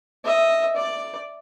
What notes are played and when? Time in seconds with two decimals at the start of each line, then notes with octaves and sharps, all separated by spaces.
0.25 D#5 E5
0.76 D5